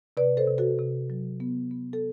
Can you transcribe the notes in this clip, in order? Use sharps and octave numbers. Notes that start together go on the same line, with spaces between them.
C3 B4 D5
A4 C5
C3
F#4 A4
C3
F#3
B3
B3
A4